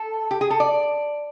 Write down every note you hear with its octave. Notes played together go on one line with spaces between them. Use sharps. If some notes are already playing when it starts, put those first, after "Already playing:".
Already playing: A4
G4
G#4
A4
D5